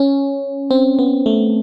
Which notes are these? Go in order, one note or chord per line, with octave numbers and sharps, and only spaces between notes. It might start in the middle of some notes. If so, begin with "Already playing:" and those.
Already playing: C#4
C4
B3
A3